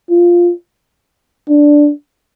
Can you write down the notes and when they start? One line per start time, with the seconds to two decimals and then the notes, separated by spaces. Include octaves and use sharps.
0.10 F4
1.49 D4